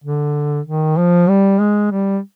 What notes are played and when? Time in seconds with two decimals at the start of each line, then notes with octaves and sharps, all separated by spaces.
0.04 D3
0.66 D#3
0.97 F3
1.29 G3
1.60 G#3
1.91 G3